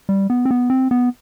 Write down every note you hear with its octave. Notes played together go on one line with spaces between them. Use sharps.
G3
B3
C4
B3
C4
B3